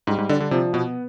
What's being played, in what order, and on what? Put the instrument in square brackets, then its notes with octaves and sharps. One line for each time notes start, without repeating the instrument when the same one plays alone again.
[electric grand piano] G#2 [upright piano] G3
[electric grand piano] G#2
[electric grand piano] D3 [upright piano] D4
[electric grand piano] D3
[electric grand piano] C3 [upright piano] F3
[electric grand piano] B2 [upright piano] B3